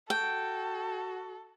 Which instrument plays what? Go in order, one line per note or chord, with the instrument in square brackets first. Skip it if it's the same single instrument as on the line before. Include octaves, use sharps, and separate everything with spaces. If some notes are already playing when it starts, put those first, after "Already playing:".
[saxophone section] F#4 [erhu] A4 [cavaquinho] G5